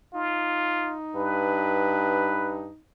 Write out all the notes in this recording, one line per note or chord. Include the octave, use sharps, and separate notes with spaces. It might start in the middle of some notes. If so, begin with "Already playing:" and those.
D#4 F4
G2 B4